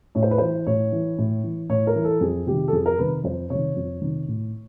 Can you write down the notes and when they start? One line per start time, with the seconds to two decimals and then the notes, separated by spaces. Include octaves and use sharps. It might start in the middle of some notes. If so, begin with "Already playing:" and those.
0.15 A2 C#5
0.23 C5
0.31 B4
0.38 E3 C5
0.67 A2 C#5
0.92 E3
1.18 A2
1.44 E3
1.70 A2 C#5
1.87 A#4
1.95 E3
2.05 A4
2.21 F2 G#4
2.46 C3 D#3 G4
2.68 A4
2.72 F2 G#4
2.86 A#4
2.99 C3 D#3 B4
3.24 F2 C5
3.50 C3 D#3 C#5
3.76 F2
4.01 C3 D#3
4.28 A2